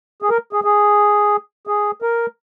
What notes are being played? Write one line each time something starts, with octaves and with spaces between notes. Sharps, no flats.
G#4
A#4
G#4
G#4
G#4
A#4